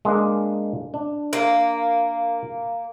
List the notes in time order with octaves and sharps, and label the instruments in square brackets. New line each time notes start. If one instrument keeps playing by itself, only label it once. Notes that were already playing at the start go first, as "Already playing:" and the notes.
[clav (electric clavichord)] G#3 A#3 D4
D4
[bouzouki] A#3